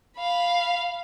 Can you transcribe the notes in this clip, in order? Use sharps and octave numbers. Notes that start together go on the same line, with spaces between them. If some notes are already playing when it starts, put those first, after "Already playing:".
F5 B5